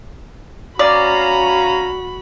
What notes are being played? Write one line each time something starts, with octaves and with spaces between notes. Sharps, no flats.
C#4 F#4 D5 F5 A#5 B5